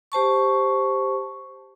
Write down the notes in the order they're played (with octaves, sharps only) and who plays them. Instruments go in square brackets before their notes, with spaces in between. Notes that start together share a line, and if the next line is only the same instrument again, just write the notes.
[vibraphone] G4 C5 A5 C#6